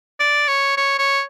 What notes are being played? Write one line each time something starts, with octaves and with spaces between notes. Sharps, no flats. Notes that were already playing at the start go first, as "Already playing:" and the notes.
D5
C#5
C#5
C#5